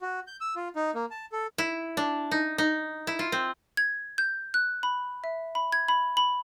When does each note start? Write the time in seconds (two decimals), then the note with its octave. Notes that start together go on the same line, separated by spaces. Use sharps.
0.01 F#4
0.27 G6
0.41 E6
0.56 F4
0.76 D#4
0.95 A#3
1.11 A5
1.32 A4
1.58 E4
1.97 D4
2.31 D#4
2.58 D#4
3.07 E4
3.19 F4
3.32 C4
3.77 G#6
4.18 G6
4.54 F#6
4.83 B5
5.24 E5
5.55 B5
5.72 G#6
5.88 B5
6.17 B5